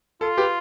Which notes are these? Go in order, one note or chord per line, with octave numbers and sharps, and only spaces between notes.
F4 A4
G4 B4